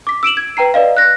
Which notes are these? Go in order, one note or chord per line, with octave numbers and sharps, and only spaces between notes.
D6 B6
E6 D7 E7 F#7
G#6
B4 G5 A#5 C7
B4 D5 D#5 F5
F#6 A#6